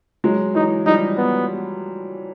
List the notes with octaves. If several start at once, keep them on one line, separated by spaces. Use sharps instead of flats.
F#3 G#3
E3 F#3 D#4
F3 G3 D#4
B3